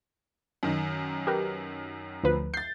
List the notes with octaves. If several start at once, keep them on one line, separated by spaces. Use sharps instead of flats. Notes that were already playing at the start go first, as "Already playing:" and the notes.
F#2 D#3
G4 A#4 B4
D2 F3 B4
G6 A6 C7